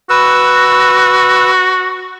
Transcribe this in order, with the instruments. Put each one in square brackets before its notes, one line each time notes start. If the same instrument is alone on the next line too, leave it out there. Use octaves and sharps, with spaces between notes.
[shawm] F#4 [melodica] B4 E6